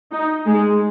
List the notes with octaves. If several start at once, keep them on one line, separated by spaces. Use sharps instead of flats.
D#4
G#3